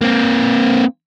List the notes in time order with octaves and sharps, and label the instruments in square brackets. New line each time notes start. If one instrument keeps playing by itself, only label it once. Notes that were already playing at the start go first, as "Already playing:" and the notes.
[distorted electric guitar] A#3 C4